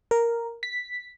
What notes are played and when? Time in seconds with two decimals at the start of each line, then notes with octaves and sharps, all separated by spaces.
0.11 A#4
0.63 B6